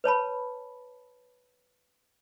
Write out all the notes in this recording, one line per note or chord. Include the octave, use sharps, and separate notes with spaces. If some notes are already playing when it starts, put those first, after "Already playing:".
B4 C#5 A5 B5